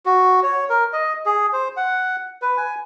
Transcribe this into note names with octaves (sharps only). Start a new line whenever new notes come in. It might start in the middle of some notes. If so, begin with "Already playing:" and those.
F#4
C#5
A#4
D#5
G#4
C5
F#5
B4
G#5